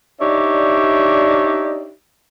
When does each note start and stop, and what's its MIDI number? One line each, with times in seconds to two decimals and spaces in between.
0.20 1.90 62
0.20 1.90 63
0.20 1.90 67
0.20 1.90 73
0.20 1.90 74
0.20 1.90 76